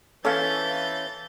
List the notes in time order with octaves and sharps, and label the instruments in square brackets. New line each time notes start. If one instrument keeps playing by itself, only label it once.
[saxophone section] E3 [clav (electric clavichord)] C#4 [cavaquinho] A4 C5 F5 [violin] G6 A6